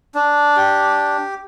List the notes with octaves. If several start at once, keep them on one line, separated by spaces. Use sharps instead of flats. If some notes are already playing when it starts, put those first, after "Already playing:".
D4
G4